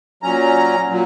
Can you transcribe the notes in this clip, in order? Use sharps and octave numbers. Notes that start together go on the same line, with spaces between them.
A#2 F#3 C#4 A#5
A#2 F#3